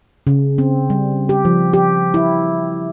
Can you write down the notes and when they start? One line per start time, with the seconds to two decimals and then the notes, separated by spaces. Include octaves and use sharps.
0.27 C#3
0.58 C4
0.90 G3
1.29 G4
1.45 F3
1.73 G4
2.14 E4